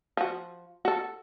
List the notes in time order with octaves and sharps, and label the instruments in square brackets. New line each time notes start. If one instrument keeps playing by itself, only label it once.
[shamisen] F3 F#4
F#4 A4